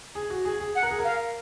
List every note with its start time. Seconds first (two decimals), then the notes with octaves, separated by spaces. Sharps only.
0.15 G#4
0.30 F#4
0.45 G#4
0.60 G#4
0.75 F#5
0.83 A#4
0.91 G#4
0.99 A#4
1.04 F5